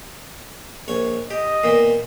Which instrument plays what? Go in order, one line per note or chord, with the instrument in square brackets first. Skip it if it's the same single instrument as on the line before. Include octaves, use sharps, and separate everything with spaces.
[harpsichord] A#1 C#5
[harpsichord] G4 [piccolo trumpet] D#5
[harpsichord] A#2 D#3 B3